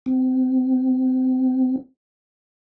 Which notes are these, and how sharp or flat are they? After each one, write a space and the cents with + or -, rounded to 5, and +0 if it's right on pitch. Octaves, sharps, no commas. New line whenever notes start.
C4 -25